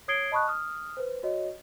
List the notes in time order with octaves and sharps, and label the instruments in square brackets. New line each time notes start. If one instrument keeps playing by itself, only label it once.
[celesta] C#5 D#6 G#6 C7 D7 G7
D#5 A5 B5 C#6 D#6 F#6
D#6 F6
B4 C5
F#4 C#5 D#5